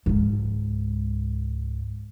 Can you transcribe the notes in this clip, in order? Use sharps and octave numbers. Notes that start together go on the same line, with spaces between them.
C#2 G#2